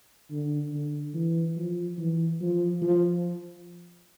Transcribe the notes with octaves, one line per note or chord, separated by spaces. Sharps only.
D3
D3
E3
F3
E3
F3
F3